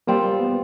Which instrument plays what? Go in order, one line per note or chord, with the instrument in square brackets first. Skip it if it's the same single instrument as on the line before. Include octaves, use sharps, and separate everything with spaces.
[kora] G3 C4 F4 [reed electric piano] A#3
[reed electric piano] B3